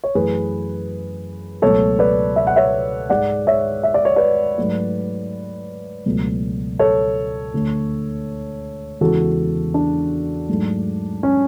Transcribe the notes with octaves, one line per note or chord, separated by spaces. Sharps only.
C#5
F#2 E3 A3 G#4 B4
C#2 B2 F#3 A3 A4 C#5
B4 D5
E5
F#5
C#5 E5
G#2 G#3 D5 F#5
C#5 E5
E5
D5
C#5
B4 D5
G#2 F#3 A3
C#2 B2 F#3 A3
A4 C#5
D2 D3 A3
E2 C#3 E3 G#3 F#4 A4
D4
G#2 F#3 A3
C#4